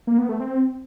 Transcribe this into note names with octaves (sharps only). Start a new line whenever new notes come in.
A#3
B3
A3
C4